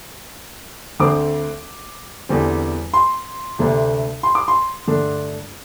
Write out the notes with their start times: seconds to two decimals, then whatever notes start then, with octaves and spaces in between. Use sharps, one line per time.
0.99 D2 D3 C4 D6
2.29 E2 D3 G3 C4
2.94 C6
3.59 D2 C3 A3 D4
4.23 C6
4.35 D6
4.48 C6
4.87 G2 D3 A3 D4